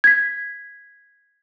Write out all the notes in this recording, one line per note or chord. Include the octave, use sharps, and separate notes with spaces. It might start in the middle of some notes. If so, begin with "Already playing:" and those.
G#6 B6